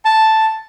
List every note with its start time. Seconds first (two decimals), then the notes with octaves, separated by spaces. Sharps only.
0.05 A5